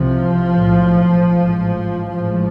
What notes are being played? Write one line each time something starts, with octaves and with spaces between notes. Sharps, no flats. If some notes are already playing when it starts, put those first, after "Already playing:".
Already playing: C2 C3 F3
B1 A2
A1 G#2
A1 G#2 F3